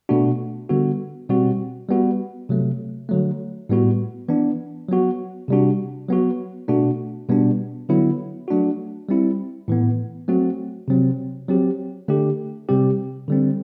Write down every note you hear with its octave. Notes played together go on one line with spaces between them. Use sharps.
B2 A3 D4 F#4
D3 G3 B3 F#4
B2 G3 C4 F#4
G3 B3 F#4
C3 F#3 A3
D3 F#3 A3
A2 G3 B3 F#4
E3 B3 D4
F#3 B3 F#4
C3 G3 D4 F#4
F#3 B3 F#4
B2 A3 D4 F#4
B2 G3 B3 D4
D3 F#3 B3 E4
F#3 A3 D4 F#4
G3 C4 E4
A2 E3 B3
F#3 A3 C4 F#4
C3 F#3 C4
F#3 C4 G4
D3 A3 D4 G4
C3 G3 C4 G4
D3 G3 C4